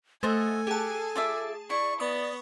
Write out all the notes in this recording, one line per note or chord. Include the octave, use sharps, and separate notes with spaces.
A3 A4 C5 D#5 F#5 G#5
G4 G#4 F#5 A5
F4 D5 E5
E4 D5 C#6
B3 D5 C#6 D#6